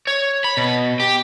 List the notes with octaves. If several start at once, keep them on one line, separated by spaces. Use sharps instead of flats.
C#5
B5
B2
G4